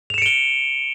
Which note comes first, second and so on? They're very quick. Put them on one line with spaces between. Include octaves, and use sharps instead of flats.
F7 E7 C#7 D7 G7